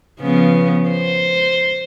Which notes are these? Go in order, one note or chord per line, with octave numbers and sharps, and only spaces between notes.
C#3 F3 B3
C5